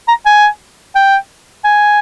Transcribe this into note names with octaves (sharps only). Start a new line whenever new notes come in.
A#5
G#5
G5
G#5